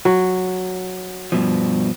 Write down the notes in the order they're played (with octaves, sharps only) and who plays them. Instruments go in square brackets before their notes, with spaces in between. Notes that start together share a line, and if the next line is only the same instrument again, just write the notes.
[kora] F#3
[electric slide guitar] G2 B2 F3